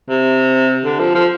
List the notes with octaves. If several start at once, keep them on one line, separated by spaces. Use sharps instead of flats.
C3
D3
F3
F3